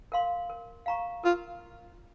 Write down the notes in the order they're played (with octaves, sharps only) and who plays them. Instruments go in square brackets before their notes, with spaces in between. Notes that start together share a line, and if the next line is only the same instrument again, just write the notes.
[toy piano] A#4 F5 C6
A#4
F5 A#5 C#6
[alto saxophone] F4 [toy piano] A#4